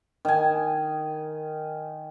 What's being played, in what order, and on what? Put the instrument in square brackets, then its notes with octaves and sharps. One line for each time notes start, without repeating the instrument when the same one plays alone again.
[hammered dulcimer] D#3 G#5